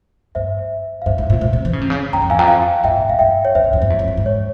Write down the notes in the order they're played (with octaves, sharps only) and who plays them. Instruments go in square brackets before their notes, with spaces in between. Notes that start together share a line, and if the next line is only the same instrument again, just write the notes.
[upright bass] G2 [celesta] C5 E5
[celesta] F5
[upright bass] G2 [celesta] C5 E5
[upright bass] G#2
A#2
[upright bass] G#2 [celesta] C5
[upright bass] C3
E3
C#3
C3
C#3
[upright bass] G2 [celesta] G5 A#5
[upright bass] F2
[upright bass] E2 [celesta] F5 G#5
[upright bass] F2 [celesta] G5 A#5
[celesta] F5 G#5
[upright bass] G2 [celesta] E5 G5
[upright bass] A#2
[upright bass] G#2 [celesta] F5
[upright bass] G2 [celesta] E5 G5
[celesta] C#5
[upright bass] F2 [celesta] C5 E5
[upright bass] E2
F2
G2
E2
F2
G2
G#2
[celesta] C#5